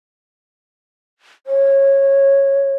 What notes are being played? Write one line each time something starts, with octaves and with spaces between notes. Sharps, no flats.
C#5